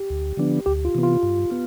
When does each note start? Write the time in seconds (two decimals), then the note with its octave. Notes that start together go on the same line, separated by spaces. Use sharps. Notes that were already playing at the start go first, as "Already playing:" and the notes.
Already playing: G4
0.10 D2
0.37 D3 F3 B3 D4
0.66 D2 G4
0.85 F4
0.95 C3 E3 B3
1.03 F4
1.23 G2
1.50 B3 F4